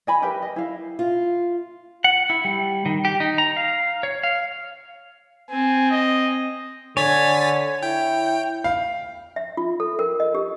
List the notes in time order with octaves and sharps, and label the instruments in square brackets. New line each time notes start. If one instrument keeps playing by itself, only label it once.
[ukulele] D#5 G#5 B5
G4 A#4 B4 E5
D#5
E4 F5
[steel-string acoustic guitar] F4
[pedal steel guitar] F#5
E4
G3
D#3
G4
D#4
A#5
F5
C#5
F5
[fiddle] C4 [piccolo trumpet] G#5
[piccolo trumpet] D#5
[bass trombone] D3 [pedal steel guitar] C#5 [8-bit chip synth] G#5 A6 B6
[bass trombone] E4 [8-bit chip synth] G5
[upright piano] F5
[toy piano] E5
F4
A4
A#4
D#5
G4